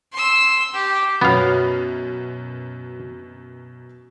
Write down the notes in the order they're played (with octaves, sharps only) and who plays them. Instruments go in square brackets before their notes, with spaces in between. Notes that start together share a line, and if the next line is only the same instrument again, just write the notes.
[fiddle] C6 E6
G4
[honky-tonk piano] F#2 B2 [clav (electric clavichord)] B3 F5 [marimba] F#4 C#5 A#6